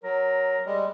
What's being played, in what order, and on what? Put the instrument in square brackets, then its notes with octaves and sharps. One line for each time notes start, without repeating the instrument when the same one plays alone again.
[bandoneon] F#3 [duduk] A#4
[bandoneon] G3 G#3